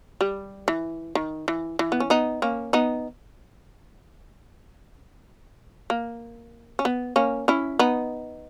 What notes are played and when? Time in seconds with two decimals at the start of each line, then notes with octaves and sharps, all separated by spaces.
0.21 G3
0.68 E3
1.15 D#3
1.48 E3
1.79 E3
1.92 B3
2.00 C#4
2.10 B3 D#4
2.42 A#3 C#4
2.73 B3 D#4
5.90 A#3
6.79 C#4
6.85 B3
7.16 A#3 C#4
7.48 C#4 E4
7.79 B3 D#4